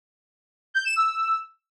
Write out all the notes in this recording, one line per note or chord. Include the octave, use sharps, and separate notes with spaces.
G6
E7
E6